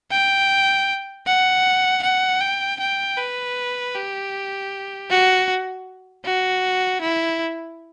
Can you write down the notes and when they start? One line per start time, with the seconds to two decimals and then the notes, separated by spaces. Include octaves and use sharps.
0.11 G5
1.27 F#5
2.03 F#5
2.41 G5
2.80 G5
3.18 B4
3.95 G4
5.10 F#4
6.25 F#4
7.01 E4